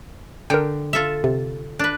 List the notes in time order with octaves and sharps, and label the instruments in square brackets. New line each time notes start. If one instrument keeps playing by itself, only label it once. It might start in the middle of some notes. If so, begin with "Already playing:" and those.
[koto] D3 [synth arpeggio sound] A#4 G5
[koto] F4 A4 E5 [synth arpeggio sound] E7
[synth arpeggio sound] C3
[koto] D4 B4